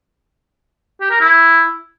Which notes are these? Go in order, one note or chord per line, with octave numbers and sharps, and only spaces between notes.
G4
A#4
E4